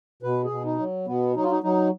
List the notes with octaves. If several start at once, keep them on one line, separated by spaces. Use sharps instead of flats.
B2 B4
G#4
B2
D#4
F#3
B2 B3
F#3 D#4
F4
D#4
F#3 D#4